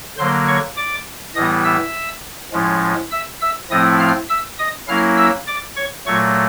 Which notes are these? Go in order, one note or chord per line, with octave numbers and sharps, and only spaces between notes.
D3 F#3 A#3 C5 C6
C#5 C#6
D5 D6
A2 E3 G3 B3 D#5 D#6
E5 E6
A2 F3 G#3 C#4
E5 E6
E5 E6
A2 F3 A3 C4 E4 D#5 D#6
F5 F6
E5 E6
D#5 D#6
F#3 A#3 C#4 E4 F5 F6
E5 E6
D5 D6
C#5 C#6
A#2 F#3 A3 C#5 C#6